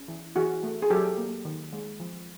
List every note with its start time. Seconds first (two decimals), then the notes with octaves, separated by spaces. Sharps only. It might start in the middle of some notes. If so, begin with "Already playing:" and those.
Already playing: C#4
0.08 E3
0.35 E3 F#4 G#4
0.63 A3
0.82 G#4
0.90 F#3 G4 A4
1.18 A#3
1.45 D#3
1.73 G#3
2.00 F3